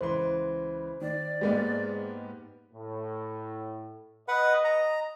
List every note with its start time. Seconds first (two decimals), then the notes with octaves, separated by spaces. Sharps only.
0.01 C#2 E3 C5 C6
1.01 D#3 D5
1.41 G#2 G#3 A#3 B3 G4
2.72 A2
4.28 B4 D#5 F#5
4.65 A#5